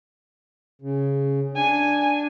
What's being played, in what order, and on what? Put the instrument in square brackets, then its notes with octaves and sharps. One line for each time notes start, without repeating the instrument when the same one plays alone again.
[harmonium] C#3
[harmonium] D4 [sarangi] G#5